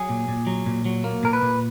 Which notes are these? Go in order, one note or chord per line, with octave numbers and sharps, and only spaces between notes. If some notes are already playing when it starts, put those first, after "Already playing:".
Already playing: F#3 G#4
A#2
A#2
F#3
A#2
F#3
A#3
A#2 A#4
B4
A#2